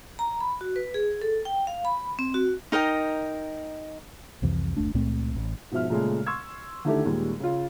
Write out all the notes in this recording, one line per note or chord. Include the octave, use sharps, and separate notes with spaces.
A#5
B5
F#4
B4
G#4
A4
G5
F5
B5
C4
F#4
D#4 A#4 D#5 G5
C2 F2 C3 E3
F#1 D2 A3 D4
C#2 A#2 A3 C4
A1
G#2 B2 F3 E5 F6
A#2 C#3 G#3 A3
C6 C#6 E6 G#6
D3 D#3 A3 E4 G4 A4
D#2 A#2 G3 G#3
C#3 F4